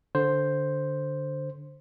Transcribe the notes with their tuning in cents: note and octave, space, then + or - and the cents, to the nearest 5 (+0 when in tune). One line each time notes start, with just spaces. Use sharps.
D3 +0 C5 +0